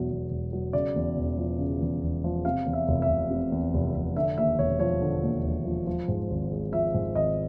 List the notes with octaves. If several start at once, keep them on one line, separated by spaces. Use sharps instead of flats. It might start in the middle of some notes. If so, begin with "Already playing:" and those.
Already playing: E1 E2 B2 F#3
E2
E1
F#3
C#3 D5
E2
E1
F3
C#3
E2
E1
F3
C3 F5
E2
E5
F1
E5
F1
C3
E2
F1
F1
D3 E5
D#2 E5
E1 C#5
F3 C#5
D3
D#2
E1
F3
F3
G#2
G#1
G#3
F3 E5
G#2
G#1 D#5